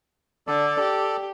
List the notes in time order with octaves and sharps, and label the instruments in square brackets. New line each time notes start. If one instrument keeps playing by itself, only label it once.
[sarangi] D3 [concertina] A4 D5
[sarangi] G4